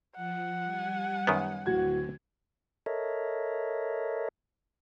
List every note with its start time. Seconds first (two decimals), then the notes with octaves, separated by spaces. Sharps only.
0.16 F3 F#5
0.64 G3 G#5
1.27 F#2 D#3 B3
1.66 D1 D3 F#4 G#6
2.86 A4 A#4 C#5 D#5 E5